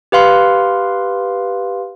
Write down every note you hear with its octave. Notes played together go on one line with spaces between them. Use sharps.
G4 B4 F5 C6